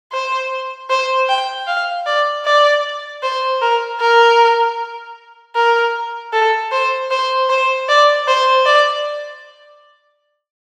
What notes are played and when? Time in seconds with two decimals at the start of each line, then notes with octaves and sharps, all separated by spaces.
0.12 C5
0.90 C5
1.29 G5
1.67 F5
2.06 D5
2.45 D5
3.23 C5
3.62 A#4
4.00 A#4
5.56 A#4
6.33 A4
6.72 C5
7.11 C5
7.49 C5
7.88 D5
8.28 C5
8.66 D5